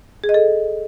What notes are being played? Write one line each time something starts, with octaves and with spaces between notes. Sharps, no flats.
G#4
D#5
A4